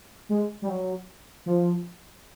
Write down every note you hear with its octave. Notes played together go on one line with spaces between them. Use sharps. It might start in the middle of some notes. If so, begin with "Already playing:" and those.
G#3
G3
F#3
F3